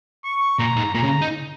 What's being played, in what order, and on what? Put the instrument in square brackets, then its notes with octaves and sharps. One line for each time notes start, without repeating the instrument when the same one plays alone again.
[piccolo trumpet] C#6
[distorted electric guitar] A#2 [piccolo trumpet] A#5
[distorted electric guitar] G#2
[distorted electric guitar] A#2 [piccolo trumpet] A#5
[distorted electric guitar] C#3
D#4